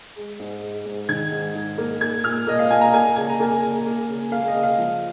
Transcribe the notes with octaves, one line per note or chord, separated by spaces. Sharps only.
G#3
G#2
G#3
G#2
D#3 G#6
G#2
G#2
A#3
A#3 G#6
A#2 F6
A#3 D#5
F5
A#2 G#5
A#5
A#3 G#5
C#3 G#5
A#5
A#3 G#5
C#3
A#3
C#3
A#3 F5
D#5
C#3
F5
F3